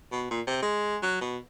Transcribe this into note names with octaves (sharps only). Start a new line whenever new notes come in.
B2
A#2
C3
G#3
F#3
B2